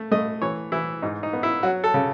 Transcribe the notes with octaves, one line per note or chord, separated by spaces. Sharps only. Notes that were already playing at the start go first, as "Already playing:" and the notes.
Already playing: A3
A3 D#5
E3 C#5
E3 E4
G#2 D#4
D#4
B3
E4
F#3 F#4
A4
C#3